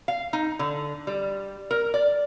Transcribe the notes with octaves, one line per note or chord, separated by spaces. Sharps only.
F5
D#4
D3
G3
A#4
D5